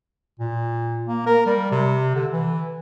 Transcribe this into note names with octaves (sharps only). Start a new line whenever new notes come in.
A#2
A#3
A#4
G3
C3
D3
E3